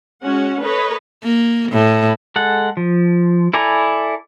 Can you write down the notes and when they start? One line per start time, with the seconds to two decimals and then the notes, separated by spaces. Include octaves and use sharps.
0.23 G#3 C#4 F#4 F#5
0.61 A4 B4 C#5 D#5
1.23 A#3
1.72 A2
2.36 G#3 A4 F#5
2.77 F3
3.54 E4 A4 D5 G#5 A#5